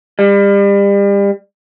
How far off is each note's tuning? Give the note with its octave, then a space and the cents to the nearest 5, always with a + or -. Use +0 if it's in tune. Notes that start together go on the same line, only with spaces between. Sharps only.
G3 +35